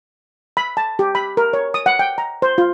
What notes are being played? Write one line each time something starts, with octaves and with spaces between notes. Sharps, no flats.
B5
A5
G4
B5
A#4
C#5
D#6
F#5
G5
A#5
C5
F4